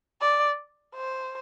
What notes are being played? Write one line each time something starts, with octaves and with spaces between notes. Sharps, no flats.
D5
C5